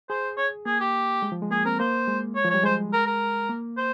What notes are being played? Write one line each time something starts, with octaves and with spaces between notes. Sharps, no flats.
G#4 C5
C#5
A#3 G#4
G4
G#3
F3
G#3
A#3 G#4
C4 A#4
A#3 C5
G#3
C#5
F3
G3 C#5
G#3 C5
A#4
A#4
A#3
C5